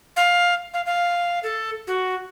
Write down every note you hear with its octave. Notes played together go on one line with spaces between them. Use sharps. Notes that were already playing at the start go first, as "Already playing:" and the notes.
F5
F5
F5
A4
F#4